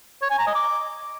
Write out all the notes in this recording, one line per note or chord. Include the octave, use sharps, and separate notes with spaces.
C#5
G#5
A#5
D#5
D6